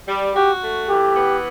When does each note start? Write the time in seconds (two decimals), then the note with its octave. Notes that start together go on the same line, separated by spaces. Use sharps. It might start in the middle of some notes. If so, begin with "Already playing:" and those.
0.08 G3
0.35 F#4 G4
0.63 A3
0.89 E3 G4
1.16 B3